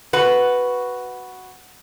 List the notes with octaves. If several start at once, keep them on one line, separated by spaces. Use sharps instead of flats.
F#4 B4